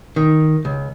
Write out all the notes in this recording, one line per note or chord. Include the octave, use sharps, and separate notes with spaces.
D#3
C#2